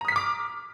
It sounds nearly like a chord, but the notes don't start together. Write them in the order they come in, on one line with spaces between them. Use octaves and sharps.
A#5 D#6 B6 F6 D6